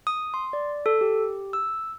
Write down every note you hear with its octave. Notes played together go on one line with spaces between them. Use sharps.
D#6
C6
D5
A4
G4
E6